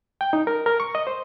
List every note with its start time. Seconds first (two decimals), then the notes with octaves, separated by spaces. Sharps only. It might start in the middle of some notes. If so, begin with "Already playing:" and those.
0.21 G5
0.33 D#4
0.47 A#4
0.66 A#4
0.80 C#6
0.95 D#5
1.07 C5